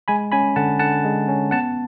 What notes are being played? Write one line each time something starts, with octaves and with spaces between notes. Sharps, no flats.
G#3 G#5 B5
C#4 G#5 B5
D3 F#5 A5
D3 F#5 A5
G#3
C#4
B3 F#5 A5